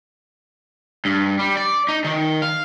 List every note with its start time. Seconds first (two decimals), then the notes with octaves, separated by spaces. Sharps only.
1.05 G2
1.39 G3
1.57 D5
1.88 D#4
2.04 D#3
2.42 F5